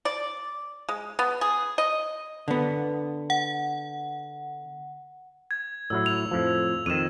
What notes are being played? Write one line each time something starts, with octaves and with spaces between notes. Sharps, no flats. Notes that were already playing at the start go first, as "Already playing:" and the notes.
D5
G#3
B3
G#4
D#5
D3 B3
F#5
G#6
A2 F#3 E4 E6
F7
F2 A2 F3
F2 D#3 D#7 E7